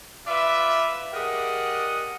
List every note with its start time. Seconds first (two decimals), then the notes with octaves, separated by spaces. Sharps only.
0.27 F4 B4 D5 E5
1.13 G4 G#4 A#4 D5 D#5 F#5